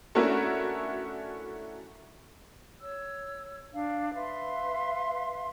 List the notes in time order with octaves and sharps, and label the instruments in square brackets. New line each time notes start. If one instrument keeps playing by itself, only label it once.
[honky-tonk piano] A3 C#4 D4 E4 F#4 A#4
[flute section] C#5 E6
D4 F5
B4 E5 F5 C6